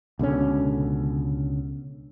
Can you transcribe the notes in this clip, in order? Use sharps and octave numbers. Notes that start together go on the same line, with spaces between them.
C#2 B2 D3 C#4